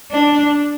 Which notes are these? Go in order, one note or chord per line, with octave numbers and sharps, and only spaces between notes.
D4